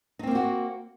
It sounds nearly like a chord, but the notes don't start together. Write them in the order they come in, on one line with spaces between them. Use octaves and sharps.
D#4 C4 A#3 C5 F#4